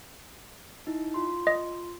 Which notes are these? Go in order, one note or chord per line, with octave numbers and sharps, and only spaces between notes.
D#4 E4
F4 C6
D#5